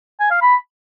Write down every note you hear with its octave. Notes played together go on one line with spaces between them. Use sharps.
G#5
F5
B5